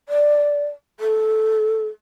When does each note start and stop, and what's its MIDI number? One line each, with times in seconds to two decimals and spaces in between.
0.09 0.65 74
1.00 1.87 69